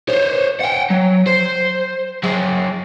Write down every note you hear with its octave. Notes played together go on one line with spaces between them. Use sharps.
C5 C#5
F#5 G5
F#3
C5
F#3 G#4